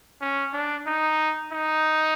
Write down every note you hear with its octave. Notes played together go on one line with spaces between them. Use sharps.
C#4
D4
D#4
D#4